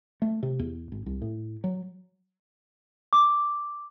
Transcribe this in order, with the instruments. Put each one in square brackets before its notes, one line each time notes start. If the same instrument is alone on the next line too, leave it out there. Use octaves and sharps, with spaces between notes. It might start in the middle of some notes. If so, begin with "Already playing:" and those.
[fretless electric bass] A3
C3
E2
G#1
C2
A2
F#3
[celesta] D6